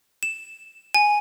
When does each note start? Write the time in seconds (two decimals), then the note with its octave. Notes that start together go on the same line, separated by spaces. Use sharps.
0.23 E7
0.94 G#5